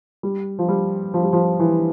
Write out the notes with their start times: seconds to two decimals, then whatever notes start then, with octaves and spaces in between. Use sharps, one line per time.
0.23 G3
0.59 F3
0.69 G3
1.14 F3
1.23 G3
1.33 F3
1.60 E3